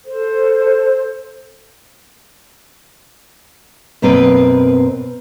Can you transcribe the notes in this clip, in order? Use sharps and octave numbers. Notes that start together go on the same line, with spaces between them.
A4 C5
F#2 B2 A#3 C4 B4